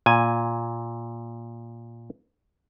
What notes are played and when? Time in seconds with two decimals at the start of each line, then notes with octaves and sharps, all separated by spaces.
0.06 A#2 G#5